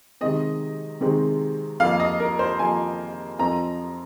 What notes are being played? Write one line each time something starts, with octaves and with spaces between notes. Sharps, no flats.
C3 D#3 G#3 C4 D#5
C3 D#3 G#3 C4
F2 F3 A#3 F5
D#5
A#4
C5
F2 F3 A#3 G#5
F2 F3 C4 A#5